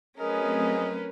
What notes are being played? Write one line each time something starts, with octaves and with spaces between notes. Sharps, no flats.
F#3 A3 C4 C#4 G#4 A#4 B4 D#5